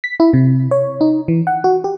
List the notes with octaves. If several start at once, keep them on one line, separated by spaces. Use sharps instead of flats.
B6
E4
C3
C#5
D#4
E3
F#5
F#4
G4